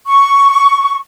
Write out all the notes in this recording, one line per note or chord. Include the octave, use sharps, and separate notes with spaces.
C#6